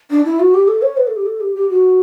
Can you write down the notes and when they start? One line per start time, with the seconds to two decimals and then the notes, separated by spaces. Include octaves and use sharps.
0.11 D4
0.25 E4
0.40 F#4
0.54 G4
0.68 A4
0.82 C#5
0.97 B4
1.07 A4
1.16 G4
1.26 A4
1.41 G4
1.55 G4
1.70 F#4